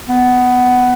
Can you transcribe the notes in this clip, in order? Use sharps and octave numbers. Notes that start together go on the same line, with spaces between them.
B3